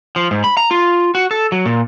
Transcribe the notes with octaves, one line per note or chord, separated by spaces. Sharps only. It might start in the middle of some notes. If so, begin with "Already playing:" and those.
F3
G#2
B5
A#5
F4
F#4
A4
F#3
A#2